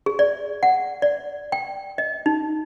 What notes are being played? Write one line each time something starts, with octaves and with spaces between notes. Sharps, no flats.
G#4
D5
F#5
D5
G5
D#5
D#4